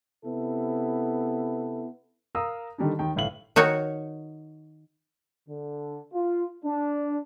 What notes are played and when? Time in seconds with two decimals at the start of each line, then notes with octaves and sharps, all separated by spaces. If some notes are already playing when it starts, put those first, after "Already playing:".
0.25 C3 B3 E4 A4
2.35 A#4 F5 A#5 D#6 E6
2.78 D3 D#3 G3 D4 D#4
2.99 D#2 D#3 G5
3.16 G1 A2 F5 F#7
3.56 D#3 D#4 F#4 C#5
5.48 D3
6.14 F4
6.64 D4